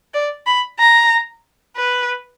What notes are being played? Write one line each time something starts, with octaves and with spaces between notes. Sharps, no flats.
D5
B5
A#5
B4